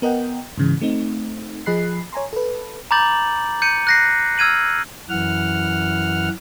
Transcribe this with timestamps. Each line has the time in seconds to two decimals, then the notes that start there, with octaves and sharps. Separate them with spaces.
0.02 B3 A#4 D#5 F#5 G5
0.58 G#2 C#3 E3
0.81 A3 C4 D#4
1.66 F3 G#4 D#5 B5 F#6 C7
2.13 C#5 G#5 A#5 C6
2.33 A4 B4
2.91 A#5 B5 D6 G6 A6 F#7
3.62 G6 C#7 D#7
3.87 F#6 A#6 C7
4.38 E6 F6 G#6 D#7 F#7
5.09 F#2 E3 F#5 F6